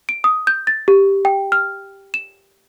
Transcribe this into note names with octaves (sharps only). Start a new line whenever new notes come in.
D7
D#6
G6
A6
G4
G5
F6
E7